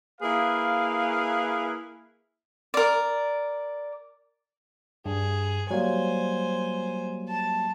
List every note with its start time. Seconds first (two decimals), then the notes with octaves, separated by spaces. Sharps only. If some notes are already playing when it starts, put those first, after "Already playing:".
0.21 A#3 E4 G#4 B4 F5
2.74 A#4 D5
5.06 G2 G#4
5.71 F#3 G3 A#3 C5 G#5
7.29 A5